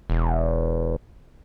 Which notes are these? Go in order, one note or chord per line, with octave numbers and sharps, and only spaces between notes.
E1